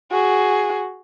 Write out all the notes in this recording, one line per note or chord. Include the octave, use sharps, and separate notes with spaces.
F#4 G#4